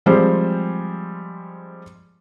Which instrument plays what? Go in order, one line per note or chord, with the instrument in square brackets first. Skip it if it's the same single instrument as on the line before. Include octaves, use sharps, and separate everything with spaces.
[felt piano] F3 G3 G#3 C4 C5